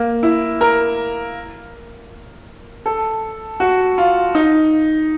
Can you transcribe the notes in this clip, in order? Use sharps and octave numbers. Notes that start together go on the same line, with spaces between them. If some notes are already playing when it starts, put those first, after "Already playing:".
Already playing: A#3
E4
A#4
A4
F#4
F4
D#4